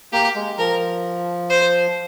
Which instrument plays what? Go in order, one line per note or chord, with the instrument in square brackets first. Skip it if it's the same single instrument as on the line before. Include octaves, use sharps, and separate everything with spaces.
[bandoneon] A#3 [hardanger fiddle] G4
[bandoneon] G#3
[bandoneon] F3 [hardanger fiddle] A#4
[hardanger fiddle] C5